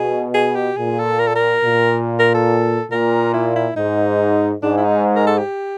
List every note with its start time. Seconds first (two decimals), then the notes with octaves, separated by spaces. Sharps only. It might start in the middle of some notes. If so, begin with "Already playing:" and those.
Already playing: B2 G#4
0.34 G#4
0.56 G4
0.77 A#2 G#4
0.99 A4
1.19 A#4
1.27 A4
1.35 A#4
1.63 A#2
2.19 A#4
2.34 A4
2.91 A#2 A#4
3.34 E4
3.56 E4
3.77 G#2 D#4
4.63 G#2 D4
4.78 E4
4.84 D#4
5.16 A#4
5.27 A4
5.38 G4